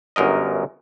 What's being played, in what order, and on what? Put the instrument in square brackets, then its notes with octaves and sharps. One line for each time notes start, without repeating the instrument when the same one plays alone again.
[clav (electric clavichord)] G1 F#2 A#4 D#5